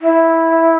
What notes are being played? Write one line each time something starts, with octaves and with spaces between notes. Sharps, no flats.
E4